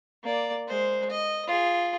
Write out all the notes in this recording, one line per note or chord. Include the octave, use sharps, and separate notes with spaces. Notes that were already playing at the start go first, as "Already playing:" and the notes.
A#3 D5
G#3 C5
D#5
F4 G#4